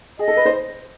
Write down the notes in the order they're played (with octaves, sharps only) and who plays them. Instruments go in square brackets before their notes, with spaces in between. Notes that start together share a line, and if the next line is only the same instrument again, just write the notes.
[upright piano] G#4 [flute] D#5
[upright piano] A4
B4
C5